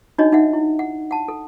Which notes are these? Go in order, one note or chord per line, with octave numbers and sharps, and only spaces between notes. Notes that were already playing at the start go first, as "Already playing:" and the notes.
D4 D#4 F#4 C#5 D#5
D#4 E5 F#5
E4
F#5
F#5 A5
A4